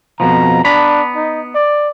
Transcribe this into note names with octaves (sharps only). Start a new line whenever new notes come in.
F2 B2 F3 A#5
B3 D4 A#5 B5
D#4
D5